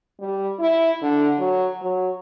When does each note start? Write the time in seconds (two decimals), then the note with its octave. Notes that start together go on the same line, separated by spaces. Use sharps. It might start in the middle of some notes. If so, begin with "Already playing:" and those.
0.20 G3
0.59 E4
1.02 D3
1.39 F#3
1.82 F#3